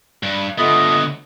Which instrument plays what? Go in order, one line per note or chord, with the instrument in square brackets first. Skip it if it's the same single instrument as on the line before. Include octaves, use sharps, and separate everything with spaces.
[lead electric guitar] G2
[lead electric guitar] D3 B3 [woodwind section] A3 F4 D#5